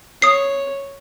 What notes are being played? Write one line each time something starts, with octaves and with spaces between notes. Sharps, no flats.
C#5 D#6 C7